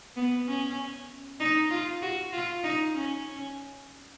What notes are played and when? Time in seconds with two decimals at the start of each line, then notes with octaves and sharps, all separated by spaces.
0.16 B3
0.47 C#4
1.40 D#4
1.70 F4
2.02 F#4
2.32 F4
2.64 D#4
2.93 C#4